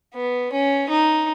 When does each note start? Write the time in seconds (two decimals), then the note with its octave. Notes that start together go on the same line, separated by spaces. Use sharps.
0.14 B3
0.53 C#4
0.89 D#4